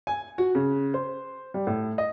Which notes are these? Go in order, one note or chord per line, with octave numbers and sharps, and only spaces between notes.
G#5
F#4
C#3
C5
G3
A2
D#5